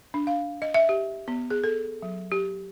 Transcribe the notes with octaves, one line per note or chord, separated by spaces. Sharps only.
D4
F5
D#5
E5
G4
B3
G#4
A4
F#3
G4